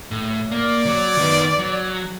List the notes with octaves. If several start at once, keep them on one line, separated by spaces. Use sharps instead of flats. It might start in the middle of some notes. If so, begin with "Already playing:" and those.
A2
A#3 D5
F#3
D#3 B3
F#3